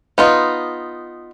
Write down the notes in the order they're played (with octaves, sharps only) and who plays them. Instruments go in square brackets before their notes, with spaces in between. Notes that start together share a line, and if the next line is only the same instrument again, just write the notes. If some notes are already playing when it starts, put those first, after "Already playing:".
[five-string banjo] B3 D#4 F4